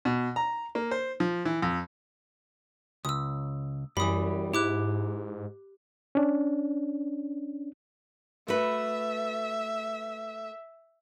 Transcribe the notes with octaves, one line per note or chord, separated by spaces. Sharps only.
B2
A#5
A#3
C5
F3
E3
F2
C#2 D#6 E6
F#2 E3 G3 B5 D#6
G#2 E4 G4 D6 F#6
C#4 D4
A3 F#4 B4 E5